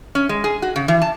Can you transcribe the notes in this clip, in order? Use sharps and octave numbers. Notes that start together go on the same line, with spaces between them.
C#4
G#3
G#4
F#4
C#3
E3
A5